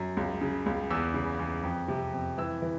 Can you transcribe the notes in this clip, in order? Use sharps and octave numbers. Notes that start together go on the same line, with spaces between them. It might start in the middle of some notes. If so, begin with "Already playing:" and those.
Already playing: F#2
C#2
C#3
C#2
E2 E6
C#3
E2
F2
C3
F2
E3 E6
E3